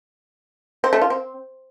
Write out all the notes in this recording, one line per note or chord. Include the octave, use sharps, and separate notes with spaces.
C4
A3
F4
C4